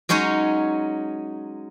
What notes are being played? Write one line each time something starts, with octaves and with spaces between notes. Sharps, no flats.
F#3 G#3 C#4 D#4 C#5